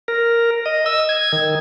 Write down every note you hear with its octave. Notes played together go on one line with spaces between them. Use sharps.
A#4
D#5
E6
G#6
D#3